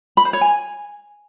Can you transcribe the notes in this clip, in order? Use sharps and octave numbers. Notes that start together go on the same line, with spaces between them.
B5
C5
C#5
G#5